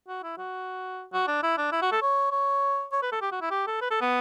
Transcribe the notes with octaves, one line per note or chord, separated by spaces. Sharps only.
F#4
E4
F#4
F#4
D4
E4
D4
E4
F#4
A4
C#5
C#5
C#5
B4
A4
G4
F#4
E4
G4
A4
B4
A4
B3